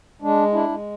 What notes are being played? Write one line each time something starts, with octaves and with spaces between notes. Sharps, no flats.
G#3 D4
D4 E4
G#3